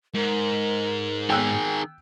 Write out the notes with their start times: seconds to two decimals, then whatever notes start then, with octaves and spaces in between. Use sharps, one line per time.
0.15 G#2 A#4
1.30 D#3 G#4 G5 E6 F#6